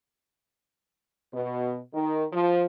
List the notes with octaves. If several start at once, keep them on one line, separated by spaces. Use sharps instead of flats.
B2
D#3
F3